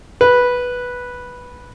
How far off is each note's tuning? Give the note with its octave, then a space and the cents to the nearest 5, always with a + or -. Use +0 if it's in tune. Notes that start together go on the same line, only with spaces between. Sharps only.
B4 -5